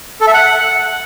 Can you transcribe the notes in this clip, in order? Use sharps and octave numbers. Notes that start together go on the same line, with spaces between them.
A4
E5
F#5